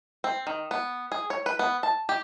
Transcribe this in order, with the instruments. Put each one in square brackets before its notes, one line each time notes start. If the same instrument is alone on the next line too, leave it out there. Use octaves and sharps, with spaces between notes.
[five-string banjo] C4
D#3
B3
G#4
C#5
B4
B3
A5
G4